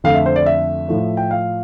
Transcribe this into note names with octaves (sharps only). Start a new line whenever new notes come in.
F2 D3 A3 F5
E5
C5
D5
E5
A2 F3 A3
G5
F5